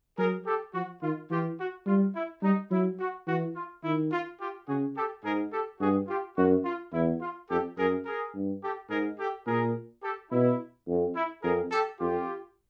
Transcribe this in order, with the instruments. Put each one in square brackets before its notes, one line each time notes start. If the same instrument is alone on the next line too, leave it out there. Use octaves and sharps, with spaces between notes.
[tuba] F#3 [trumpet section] G#4 A#4
[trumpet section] G4 A4
[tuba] F3 [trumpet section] F#4
[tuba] D#3 [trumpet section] F4
[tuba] E3 [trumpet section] F4 G4
[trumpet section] F#4
[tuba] G3 [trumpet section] F4
[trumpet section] E4
[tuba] G3 [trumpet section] D#4
[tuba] F#3 [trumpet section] E4
[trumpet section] F#4
[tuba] E3 [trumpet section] F#4
[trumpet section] F4
[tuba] D#3 [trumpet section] E4
[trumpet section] F4
F4 G4
[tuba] C#3 [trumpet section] F#4 G#4
[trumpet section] G4 A4
[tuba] G#2 [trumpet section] G#4 A#4
[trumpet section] G4 A4
[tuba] G2 [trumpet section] F#4 G#4
[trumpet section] F4 G4
[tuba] F#2 [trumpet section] F#4
[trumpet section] F4
[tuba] E2 [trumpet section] E4
[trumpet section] F4
[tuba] F2 [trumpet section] G4 A4
[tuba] F#2 [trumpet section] G#4 A#4
[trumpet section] G#4 A#4
[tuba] G2
[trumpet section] G4 A4
[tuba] G#2 [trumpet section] G#4 A#4
[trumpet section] G4 A4
[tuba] A#2 [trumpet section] G#4 A#4
[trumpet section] G4 A4
[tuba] B2 [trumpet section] E4
[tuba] F2
[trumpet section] E4
[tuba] F2 [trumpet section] G#4 A#4
[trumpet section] G4 A4
[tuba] F2 [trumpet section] F4 G4